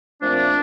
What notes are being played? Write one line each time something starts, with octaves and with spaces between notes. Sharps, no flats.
A#2 F3 A3 C4 D4